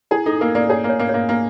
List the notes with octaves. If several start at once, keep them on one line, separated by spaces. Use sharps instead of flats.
E4 G#4
D#4 A4
A#3 A#4
A#3 D5
G#4 C#5
A#3
C#5
A#3
C#5
A#3
A#3